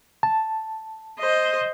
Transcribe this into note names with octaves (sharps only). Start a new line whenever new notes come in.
A5
C5 D#5